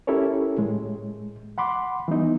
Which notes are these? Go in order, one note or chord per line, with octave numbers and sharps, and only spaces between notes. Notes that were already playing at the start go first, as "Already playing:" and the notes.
C#4 E4 G4 A4 A#4 C#5
A2 G#3
F#5 B5 C6 D6
E3 G3 B3 D#4